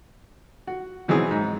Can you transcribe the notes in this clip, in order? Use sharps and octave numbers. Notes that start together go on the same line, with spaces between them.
F#4
B2 E3 F#3 C4 G#4
G#2